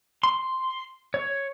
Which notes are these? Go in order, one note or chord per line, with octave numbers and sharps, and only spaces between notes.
C6
C#5